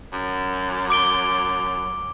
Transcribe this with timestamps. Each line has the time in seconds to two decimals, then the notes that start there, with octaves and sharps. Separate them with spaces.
0.12 F#2
0.90 D6 D7 G7